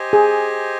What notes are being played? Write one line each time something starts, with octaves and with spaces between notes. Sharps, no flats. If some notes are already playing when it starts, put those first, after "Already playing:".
Already playing: G4 C5 D#5 G#5
G#4